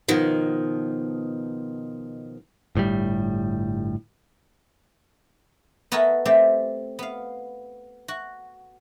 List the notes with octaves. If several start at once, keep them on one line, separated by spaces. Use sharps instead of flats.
B2 D#3 F3
G1 A2 D3 G3
B3 F#4 A4 A#4 E5 G#5
A3 C4 G4 E5
B3 F5
F#4